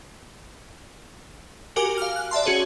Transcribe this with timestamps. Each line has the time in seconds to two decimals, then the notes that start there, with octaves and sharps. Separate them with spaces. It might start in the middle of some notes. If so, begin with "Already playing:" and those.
1.76 F#4 G4 A#4 G#5 D6
1.98 F5 F6
2.16 F#6
2.31 D5 E5 A5 C6
2.45 C#4 F#4 G#4 C#5